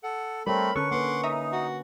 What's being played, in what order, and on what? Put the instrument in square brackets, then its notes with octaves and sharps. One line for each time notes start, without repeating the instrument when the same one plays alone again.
[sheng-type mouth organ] A4 [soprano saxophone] F#5
[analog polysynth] G3 [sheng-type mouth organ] A3 C4 [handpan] A#4 C#5 [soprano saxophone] B5
[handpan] D3 C#4 [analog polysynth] A4 [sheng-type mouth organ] B4 [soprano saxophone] C#6
[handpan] A#3 B4 [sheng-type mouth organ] F#5 C6 D6
[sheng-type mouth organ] D#4 [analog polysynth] E5 A#5 D#6
[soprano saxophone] F#4